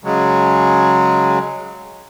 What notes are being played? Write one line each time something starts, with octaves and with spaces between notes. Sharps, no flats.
C#3 F#3 G#3